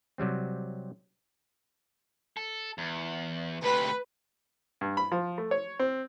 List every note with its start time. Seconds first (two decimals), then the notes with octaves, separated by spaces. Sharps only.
0.18 C3 F#3 G3 C4
2.37 A4
2.78 E2
3.63 D2 C3 B4
4.81 G2
4.97 B5
5.12 F3
5.38 A3
5.51 C#5
5.79 C4